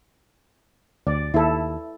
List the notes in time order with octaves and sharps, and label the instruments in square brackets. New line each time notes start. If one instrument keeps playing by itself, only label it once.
[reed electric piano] D2 [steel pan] D5
[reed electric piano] D#2 [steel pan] E4 A4